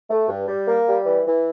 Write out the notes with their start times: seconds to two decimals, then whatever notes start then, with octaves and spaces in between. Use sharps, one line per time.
0.10 A3
0.28 G2
0.48 G3
0.67 A#3
0.87 G3
1.06 E3
1.25 E3